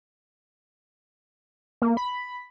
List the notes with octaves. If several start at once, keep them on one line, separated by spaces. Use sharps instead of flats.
A#3
B5